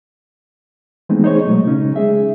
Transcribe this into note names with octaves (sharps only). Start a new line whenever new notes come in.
E3 G#3 A3 B3 C4 D#4
D#4 G#4 C5 C#5 D#5 C#6
B2 F#3 G#3 A3
C#3 C#4 D#4
G#3 G#4 E5